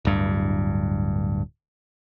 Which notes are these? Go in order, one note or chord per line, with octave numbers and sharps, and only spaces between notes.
D1 G2